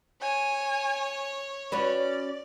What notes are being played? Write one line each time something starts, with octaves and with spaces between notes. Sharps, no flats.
C#5 G#5
C#4 F#4 B4 D5